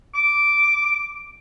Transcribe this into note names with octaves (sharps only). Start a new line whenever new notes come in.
D6